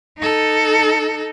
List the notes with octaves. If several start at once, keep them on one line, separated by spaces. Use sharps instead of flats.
D#4 A4